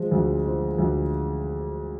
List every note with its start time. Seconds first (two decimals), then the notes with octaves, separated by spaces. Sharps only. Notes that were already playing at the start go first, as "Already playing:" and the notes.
Already playing: F3 G#3
0.12 D2
0.45 F3
0.78 D2